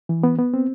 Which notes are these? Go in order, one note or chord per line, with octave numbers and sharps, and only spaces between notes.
E3
B3
B3
C4